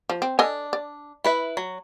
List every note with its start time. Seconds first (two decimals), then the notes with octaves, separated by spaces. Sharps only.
0.10 F3
0.22 C4
0.39 D4 A4 D#5 G#5
0.73 D5
1.24 E4 B4 E5
1.57 F#3